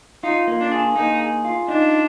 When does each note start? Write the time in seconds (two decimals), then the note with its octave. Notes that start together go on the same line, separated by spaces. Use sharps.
0.23 D#4 F4
0.47 A#3
0.60 D4
0.71 G#4
0.95 A#3 D#4
1.20 G#4
1.45 F4
1.68 D4 D#4